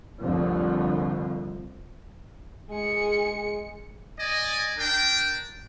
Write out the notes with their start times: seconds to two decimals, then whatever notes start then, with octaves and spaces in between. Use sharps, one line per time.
0.20 C2 F2 A2 D3 F3
2.71 G#3 G#4 C#7
4.19 D5 D#5 G#5
4.78 D4 A#4 G5